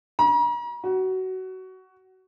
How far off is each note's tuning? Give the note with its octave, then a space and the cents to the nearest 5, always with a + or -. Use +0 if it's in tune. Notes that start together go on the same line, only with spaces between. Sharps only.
A#5 +45
F#4 +20